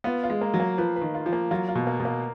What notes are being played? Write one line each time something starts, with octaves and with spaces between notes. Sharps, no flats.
B3 F4
F4
G#3
A#3
F#3
A#3
F3 B4
B4
D#3
F4
F3
A#3
F#3 F4
F4
B2
A#3
B2
A#3